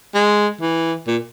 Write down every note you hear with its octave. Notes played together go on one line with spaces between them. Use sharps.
G#3
E3
A#2